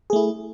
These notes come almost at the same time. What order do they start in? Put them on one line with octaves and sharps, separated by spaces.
G#4 A3 E4